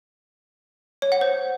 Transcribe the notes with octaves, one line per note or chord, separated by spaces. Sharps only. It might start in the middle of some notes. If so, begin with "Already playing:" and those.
C#5
F#5
C5